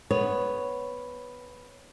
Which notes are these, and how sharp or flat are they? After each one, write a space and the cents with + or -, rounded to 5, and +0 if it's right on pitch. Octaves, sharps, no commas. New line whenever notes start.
B3 +0 C#5 +0